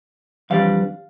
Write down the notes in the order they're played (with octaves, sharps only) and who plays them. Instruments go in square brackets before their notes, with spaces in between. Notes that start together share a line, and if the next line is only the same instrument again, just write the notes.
[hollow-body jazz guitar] F2 E3 G3 D4 F5